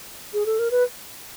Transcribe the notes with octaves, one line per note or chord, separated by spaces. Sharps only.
G#4
A4
A#4
B4